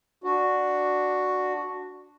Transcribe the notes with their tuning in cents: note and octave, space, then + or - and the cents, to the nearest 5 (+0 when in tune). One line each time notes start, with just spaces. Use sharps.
D4 +0 F#4 +0